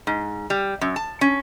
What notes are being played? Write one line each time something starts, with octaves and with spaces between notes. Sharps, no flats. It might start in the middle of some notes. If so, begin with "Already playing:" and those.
G#2
G3
F#2
A5
C#4